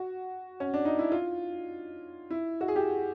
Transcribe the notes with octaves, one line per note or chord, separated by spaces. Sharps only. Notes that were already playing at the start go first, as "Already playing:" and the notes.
Already playing: F#4
C#4
D4
D#4
E4
F4
E4
F#4
G#4
G4